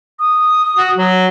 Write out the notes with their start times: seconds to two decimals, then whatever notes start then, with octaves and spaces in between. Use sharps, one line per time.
0.19 D#6
0.76 F#4
0.97 F#3